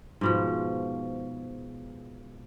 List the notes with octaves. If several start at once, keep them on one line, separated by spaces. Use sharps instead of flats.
G#2 B2 F3